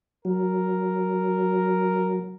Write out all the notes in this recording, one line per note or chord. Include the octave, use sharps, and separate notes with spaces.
F#3 A#4